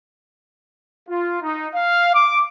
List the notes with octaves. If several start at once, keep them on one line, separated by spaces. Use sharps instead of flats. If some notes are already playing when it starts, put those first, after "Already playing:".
F4
D#4
F5
D6